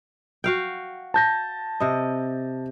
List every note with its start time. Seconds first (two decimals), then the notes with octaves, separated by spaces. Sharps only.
0.44 F#4 F5 G5
1.14 A5 G6 A#6
1.80 C3 D#5